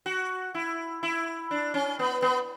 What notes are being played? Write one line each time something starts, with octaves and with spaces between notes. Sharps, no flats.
F#4
E4
E4
D4
C#4
B3
B3